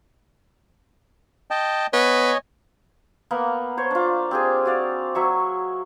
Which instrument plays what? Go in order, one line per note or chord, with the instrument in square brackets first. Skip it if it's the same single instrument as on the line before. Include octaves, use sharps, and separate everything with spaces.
[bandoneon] D#5 G5 A5
[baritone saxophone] B3 [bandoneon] C#5 D#5 G#5
[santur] A#3 B3 A#4
C5 C#5
D4 F4
C4 G4 G#4
F#4 D5 F5
F#3 E5 C#6